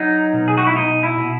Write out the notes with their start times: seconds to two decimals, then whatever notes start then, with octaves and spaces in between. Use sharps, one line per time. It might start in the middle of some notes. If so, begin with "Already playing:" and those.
Already playing: F#3 D#4
0.33 B2
0.48 G#4
0.58 F#4
0.67 E4
0.76 B2 D#4
1.03 E4
1.17 B2